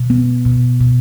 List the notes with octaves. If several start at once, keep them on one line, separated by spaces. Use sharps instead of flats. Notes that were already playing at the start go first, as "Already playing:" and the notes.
Already playing: B2
B3
B2
B2